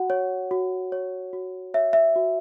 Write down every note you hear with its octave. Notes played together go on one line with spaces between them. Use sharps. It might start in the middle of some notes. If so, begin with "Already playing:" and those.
Already playing: F#4 F#5
C#5
F#4
C#5
F#4
C#5 E5
E5
F#4